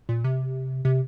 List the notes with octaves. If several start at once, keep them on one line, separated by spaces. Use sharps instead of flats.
A#2
C3
C3